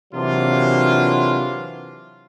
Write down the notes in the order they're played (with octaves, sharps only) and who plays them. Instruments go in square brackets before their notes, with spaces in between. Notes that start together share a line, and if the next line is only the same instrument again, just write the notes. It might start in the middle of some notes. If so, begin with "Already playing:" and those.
[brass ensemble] C3 E3 F#3 A#3 D4 F4